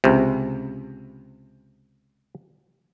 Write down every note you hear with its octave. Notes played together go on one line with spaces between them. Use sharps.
C#2 C3